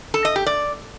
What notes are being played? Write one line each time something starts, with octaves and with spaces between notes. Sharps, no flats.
A4
D#5
G4
D5